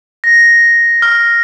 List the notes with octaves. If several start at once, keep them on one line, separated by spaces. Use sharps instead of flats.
A#6
F6